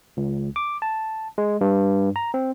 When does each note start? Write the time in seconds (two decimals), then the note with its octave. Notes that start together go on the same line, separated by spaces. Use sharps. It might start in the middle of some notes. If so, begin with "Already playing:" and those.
0.17 C#2
0.56 D6
0.82 A5
1.38 G#3
1.61 G2
2.16 A#5
2.34 C4